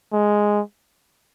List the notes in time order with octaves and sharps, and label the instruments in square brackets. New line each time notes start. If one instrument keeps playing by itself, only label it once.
[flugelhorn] G#3